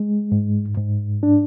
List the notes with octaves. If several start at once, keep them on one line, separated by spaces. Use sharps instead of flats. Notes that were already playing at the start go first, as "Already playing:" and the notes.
Already playing: G#3
G#2
G#2
D4